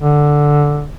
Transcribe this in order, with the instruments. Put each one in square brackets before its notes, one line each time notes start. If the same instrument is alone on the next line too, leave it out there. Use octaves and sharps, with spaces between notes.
[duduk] D3